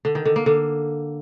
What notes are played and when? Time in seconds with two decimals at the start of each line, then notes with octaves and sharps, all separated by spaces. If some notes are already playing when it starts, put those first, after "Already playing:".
0.05 D3
0.15 D#3
0.25 D3
0.36 A#3
0.46 D3